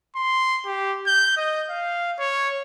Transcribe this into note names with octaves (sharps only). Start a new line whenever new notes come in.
C6
G4
G6
D#5
F5
C#5